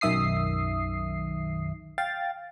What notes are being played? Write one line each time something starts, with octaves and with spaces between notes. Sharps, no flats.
B1 F#2 D#3 E5 D#6 C7
F5 G5 A6